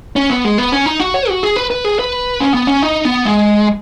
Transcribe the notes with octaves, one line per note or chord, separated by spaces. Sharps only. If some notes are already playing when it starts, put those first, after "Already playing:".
C#4
B3
G#3
B3
C#4
D#4
F#4
C#5
F#4
G#4
B4
B4
G#4
B4
C#4
B3
C#4
D#4
B3
G#3